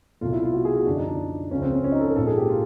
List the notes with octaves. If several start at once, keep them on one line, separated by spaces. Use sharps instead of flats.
C2 B2 F#3 A3 F4
E4
F4
F#4
G#4
F#4
F#2 D3 F3 D4
D#4
D4
C#2 C#3 F3 C#4
C4
C#4
C#4
D#4
A4
A#4
A#1 G#2 F3 A#3 A4
G#4
G4
F4